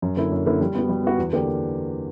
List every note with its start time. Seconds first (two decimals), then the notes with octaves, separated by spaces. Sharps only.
0.02 F#2
0.17 D3 A#3 E4
0.32 F#2
0.46 D3 A#3 E4
0.61 G3
0.75 B3 F#4
0.89 G3
1.03 B3 F#4
1.18 E2
1.33 D3 A#3 D4 G4